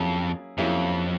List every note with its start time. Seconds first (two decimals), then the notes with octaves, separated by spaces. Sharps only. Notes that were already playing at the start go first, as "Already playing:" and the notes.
Already playing: F2 F#3 A#3 C#4 E4 G#4
0.58 F2 F#3 A#3 C#4 E4 G#4